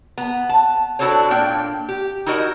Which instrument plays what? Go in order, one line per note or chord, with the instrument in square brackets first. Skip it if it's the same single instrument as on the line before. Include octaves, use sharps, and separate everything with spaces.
[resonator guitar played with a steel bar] B3 A#5
A5
D4 E4 F#4 A4 C5 C#5
A#2 A#3 D4 G5
G4
D#4 E4 F#4 A#4 D#5